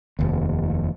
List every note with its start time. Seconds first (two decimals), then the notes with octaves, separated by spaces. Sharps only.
0.19 F1 D#2